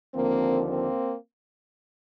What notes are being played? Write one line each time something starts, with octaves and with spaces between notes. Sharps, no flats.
D#2 D3 F3 A#3 C4
A#3 C4